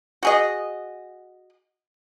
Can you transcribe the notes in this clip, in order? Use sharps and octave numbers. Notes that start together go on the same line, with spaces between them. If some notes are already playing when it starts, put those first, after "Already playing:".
F#4 G#4 D#5